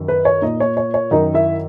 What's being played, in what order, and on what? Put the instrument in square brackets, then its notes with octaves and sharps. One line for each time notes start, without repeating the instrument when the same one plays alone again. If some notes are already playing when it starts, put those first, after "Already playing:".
Already playing: [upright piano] F#2 D#3
B4
C#5
A#2 D#4 D#5
C#5
C#5
C#5
F#2 D#3 D#4 D#5
E4 E5